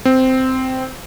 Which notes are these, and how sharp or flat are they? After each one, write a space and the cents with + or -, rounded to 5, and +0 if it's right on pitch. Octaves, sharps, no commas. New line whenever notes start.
C4 -10